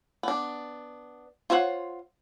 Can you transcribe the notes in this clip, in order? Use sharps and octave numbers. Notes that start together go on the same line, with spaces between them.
B3 D4
F4 C5 C#5 E5 F#5